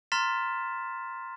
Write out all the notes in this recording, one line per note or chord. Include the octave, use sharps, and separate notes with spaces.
A#5 C6 F6 A6 B6 E7